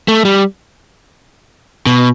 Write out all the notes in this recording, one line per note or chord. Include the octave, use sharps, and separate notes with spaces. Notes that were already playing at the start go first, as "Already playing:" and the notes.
A3
G3
B2